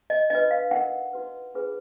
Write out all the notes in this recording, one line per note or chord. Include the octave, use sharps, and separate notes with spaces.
D#5
D4 F4 B4 D#5
F5
D#4 A#4 F#5
D#4 F#4 B4
D4 F4 G#4 B4